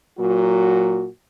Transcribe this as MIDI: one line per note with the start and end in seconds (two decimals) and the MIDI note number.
0.18 1.07 46
0.18 1.07 54
0.18 1.07 66